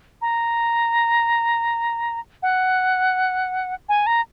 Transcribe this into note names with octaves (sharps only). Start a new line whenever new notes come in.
A#5
F#5
G#5
A#5